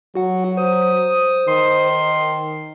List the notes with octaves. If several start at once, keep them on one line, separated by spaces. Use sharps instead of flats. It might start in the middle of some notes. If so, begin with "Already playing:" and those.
F#3 F#4 F#5
C5 D#6
D#3 C6